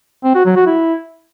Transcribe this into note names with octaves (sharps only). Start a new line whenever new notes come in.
C4
F#4
F#3
F#4
E4